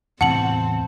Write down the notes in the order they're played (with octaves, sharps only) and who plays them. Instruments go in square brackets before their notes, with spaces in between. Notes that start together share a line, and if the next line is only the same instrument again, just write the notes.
[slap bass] E2 A2 C3 [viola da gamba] C4 [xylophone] F#5 C#7 F#7 [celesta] A5